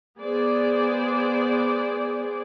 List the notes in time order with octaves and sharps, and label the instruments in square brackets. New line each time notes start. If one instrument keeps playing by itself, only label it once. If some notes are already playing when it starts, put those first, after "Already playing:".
[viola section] B3 G#4 C5 D5